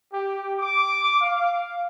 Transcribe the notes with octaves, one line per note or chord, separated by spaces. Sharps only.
G4
D6
F5